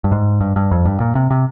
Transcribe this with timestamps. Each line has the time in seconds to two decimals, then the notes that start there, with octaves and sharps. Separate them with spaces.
0.04 G2
0.12 G#2
0.41 G2
0.56 G2
0.71 F2
0.85 G2
1.00 A#2
1.15 C3
1.31 C3